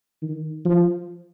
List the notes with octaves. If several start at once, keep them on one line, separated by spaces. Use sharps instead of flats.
D#3
F3